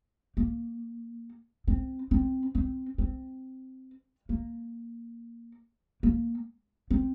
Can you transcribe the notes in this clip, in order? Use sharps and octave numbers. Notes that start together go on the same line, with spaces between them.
A#3
C4
C4
C4
C4
A#3
A#3
C4